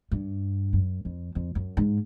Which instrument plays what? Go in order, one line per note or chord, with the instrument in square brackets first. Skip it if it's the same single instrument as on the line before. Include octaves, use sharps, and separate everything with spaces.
[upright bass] G2
F#2
F2
F2
F#2
G#2